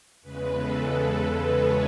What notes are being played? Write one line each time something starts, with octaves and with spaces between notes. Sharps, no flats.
E2 C#3 G#3 B4
A4
B4
C#5